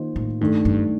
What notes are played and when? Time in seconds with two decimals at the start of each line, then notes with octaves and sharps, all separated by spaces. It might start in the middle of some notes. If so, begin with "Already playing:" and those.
Already playing: D#3 A#3 F4 C5 D#5
0.16 A2
0.41 G2 D#3 A3 D4 A4
0.65 G2